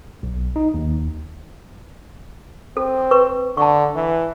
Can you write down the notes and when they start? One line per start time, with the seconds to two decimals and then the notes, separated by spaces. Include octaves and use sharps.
0.23 B1
0.56 D#4
0.74 D#2
2.77 C4 A4
3.11 B4 C#6
3.57 D3 A5 C#6
3.95 E3